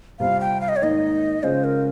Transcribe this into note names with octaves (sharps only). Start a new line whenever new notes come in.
C3 G3 C4 F4 F5
G5
F5
D#5
C#5
G#2 D#3 A#3 D#4 D#5
C#3 G#3 C#4 F4 G#4 C5
A#4